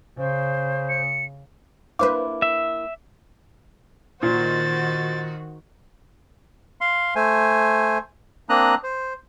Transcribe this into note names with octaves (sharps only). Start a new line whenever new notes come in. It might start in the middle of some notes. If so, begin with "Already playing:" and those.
C#3 C5
C#7
A#3 D4 E4 B4 C5 F5 D6
E5
A#2 D#3 F#4 C5 A6
F5 C6
A3 C5 G#5
A#3 C4 D4 A#5 D#6 F#6
C5